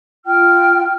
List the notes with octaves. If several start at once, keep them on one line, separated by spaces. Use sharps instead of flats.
F4 G5 F6